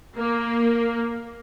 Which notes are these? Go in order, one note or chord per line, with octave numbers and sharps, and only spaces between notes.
A#3